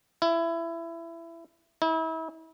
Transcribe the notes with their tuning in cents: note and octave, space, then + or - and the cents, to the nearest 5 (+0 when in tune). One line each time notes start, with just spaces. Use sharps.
E4 +20
E4 -35